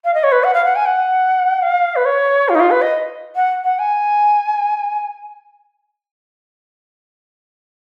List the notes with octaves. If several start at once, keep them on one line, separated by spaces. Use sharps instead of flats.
F5
D#5
C#5
B4
F#5
F5
F#5
G#5
F#5
F5
B4
C#5
F4
D#4
F4
B4
D#5
F#5
F#5
G#5